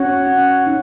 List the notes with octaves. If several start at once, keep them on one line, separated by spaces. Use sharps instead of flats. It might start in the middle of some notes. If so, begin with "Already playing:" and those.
Already playing: C#4 F#4 C#5 F#5
C#4
D#4